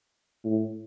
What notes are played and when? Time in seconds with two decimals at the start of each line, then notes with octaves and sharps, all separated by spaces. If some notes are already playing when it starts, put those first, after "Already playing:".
0.44 A2